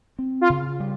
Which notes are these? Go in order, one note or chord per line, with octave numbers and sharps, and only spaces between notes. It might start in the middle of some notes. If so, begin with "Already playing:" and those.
C4
F4
C#3
G3